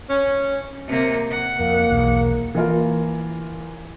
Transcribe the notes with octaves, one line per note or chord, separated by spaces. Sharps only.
C#4
C3 A#3
F#5
F2 A#3
B1 E2
E3 A#3 F4 A#4